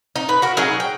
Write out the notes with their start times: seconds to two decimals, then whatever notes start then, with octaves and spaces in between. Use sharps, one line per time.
0.16 D#4
0.29 B4
0.42 F#4 A#4
0.57 F#3 D#4 G#4 A#4
0.80 G5